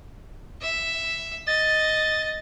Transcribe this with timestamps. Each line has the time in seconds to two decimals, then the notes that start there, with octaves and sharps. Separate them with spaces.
0.61 E5
1.47 D#5 A6